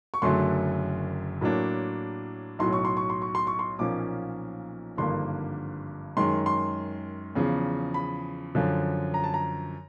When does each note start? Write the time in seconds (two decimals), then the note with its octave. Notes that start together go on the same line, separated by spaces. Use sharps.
0.14 C#6
0.22 F#1 F#2 D3 F#3 A3 C6
1.41 A2 F#3 A#3 D4
2.59 B1 A2 F#3 C6
2.73 C#6
2.85 C6
2.97 C#6
3.10 C6
3.22 C#6
3.35 C6
3.47 C#6
3.59 C6
3.79 B1 A#2 F3 A#3 C#4 D6
4.97 G#1 G2 D3 F3 A#3 C6
6.17 F#2 D#3 G#3 C6
6.46 C6
7.35 E2 C#3 F3
7.94 B5
8.55 F#2 D3 F3
9.14 A#5
9.24 A5
9.34 A#5